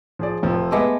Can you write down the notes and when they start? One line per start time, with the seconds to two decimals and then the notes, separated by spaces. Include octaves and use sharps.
0.19 F3 G#4 D5
0.43 F1 F2 F3
0.72 G#3 A3 B3 D6